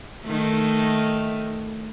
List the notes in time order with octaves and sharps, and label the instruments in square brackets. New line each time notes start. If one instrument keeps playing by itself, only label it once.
[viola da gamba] D#3 A3